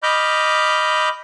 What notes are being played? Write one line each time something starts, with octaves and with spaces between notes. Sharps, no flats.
D#5 B5 D6 F6 G6